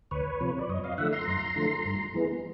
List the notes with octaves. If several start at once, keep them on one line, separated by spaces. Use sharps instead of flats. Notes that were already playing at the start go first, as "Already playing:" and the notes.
D2 B4 C#5
C3 F3
D5
F#2 C#5 D#5
D#5 F5
D3 F3 A3 E5 F#5
A#5 C6
F#2
D3 F3 A3
G2
E3 G#3 B3